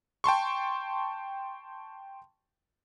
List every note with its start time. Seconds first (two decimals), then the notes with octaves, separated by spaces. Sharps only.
0.24 G5 A5 C6 C#6